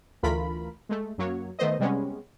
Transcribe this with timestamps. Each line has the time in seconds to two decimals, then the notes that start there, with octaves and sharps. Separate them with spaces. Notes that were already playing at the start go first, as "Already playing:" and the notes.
0.23 D2 E3 A3 F4 A#4 B5
0.89 G#3 A3
1.18 F#2 F#3 A#3 C#5
1.59 D#3 A3 B3 C5 D#5
1.80 C3 G3 G#3 B3 C#4